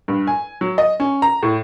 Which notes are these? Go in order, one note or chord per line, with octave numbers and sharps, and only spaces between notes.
G2
G#5
F#3
D#5
C#4
A#5
A2